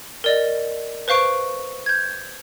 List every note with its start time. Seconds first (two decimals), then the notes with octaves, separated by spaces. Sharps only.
0.24 A#4 D5 D#5
1.08 B4 C5 F5 C#6 D7
1.86 G6 G#6